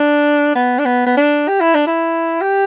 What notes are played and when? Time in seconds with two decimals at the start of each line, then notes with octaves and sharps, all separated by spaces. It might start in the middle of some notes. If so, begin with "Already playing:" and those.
Already playing: D4
0.55 B3
0.79 D4
0.86 B3
1.07 B3
1.17 D4
1.48 G4
1.61 E4
1.74 D4
1.87 E4
2.41 G4